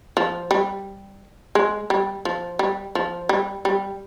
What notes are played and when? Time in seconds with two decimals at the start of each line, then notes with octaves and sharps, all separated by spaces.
0.17 F3
0.51 G3
1.55 G#3
1.90 G3
2.25 F3
2.59 G3
2.95 F3
3.29 G3
3.65 G3